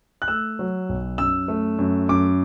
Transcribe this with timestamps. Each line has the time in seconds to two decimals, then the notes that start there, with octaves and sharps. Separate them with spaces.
0.22 F#6
0.28 A3 E6
0.59 F#3
0.89 B1
1.18 F#2 E6
1.48 A3
1.79 F#2
2.09 F#2 D6